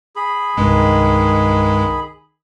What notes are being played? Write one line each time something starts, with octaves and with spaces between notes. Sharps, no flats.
G#4 B5
C2 G2 D#3 G#3